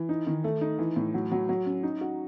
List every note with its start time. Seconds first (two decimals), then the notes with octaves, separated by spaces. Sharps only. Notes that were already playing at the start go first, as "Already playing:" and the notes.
Already playing: E3
0.09 D#4
0.27 D#3
0.44 A3
0.61 D#4
0.79 E3
0.96 A2
1.14 F#3
1.32 F#3
1.49 F#3
1.66 C#4
1.83 D#4
2.01 F#4